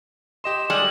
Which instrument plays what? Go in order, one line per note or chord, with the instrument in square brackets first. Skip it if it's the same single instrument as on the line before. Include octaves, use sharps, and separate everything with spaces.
[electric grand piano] G4 D#5 C6 [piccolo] E7
[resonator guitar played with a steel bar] G3 G#3 [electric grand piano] D5 [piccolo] F#7